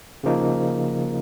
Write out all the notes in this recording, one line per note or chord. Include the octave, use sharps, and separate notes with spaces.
C#3 F3 A#3 D#4